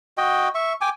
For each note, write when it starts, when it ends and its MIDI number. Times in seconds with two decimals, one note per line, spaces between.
0.18 0.48 66
0.18 0.48 75
0.18 0.48 79
0.55 0.73 76
0.55 0.73 85
0.81 0.89 79
0.81 0.89 80
0.81 0.89 86